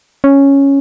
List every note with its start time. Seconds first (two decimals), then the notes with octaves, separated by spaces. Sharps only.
0.24 C#4